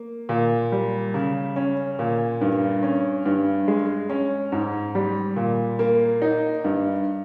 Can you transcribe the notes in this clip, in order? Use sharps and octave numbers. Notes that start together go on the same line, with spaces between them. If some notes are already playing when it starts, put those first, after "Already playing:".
Already playing: A#3
A#2
G3
C#3
C#4
A#2
G2
C#4
G2
G#3
C#4
G#2
G3
A#2
A#3
D#4
G2